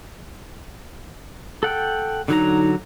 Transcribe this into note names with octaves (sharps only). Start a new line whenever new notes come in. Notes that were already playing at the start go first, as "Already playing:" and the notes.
A4 F#5 G5
D3 F#3 D#4 A#5